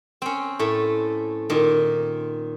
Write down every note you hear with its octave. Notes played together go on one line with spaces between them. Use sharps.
C4 C#4
A2 A3
A#2 D#3